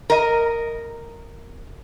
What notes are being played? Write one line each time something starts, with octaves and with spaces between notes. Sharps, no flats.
A#4 D#5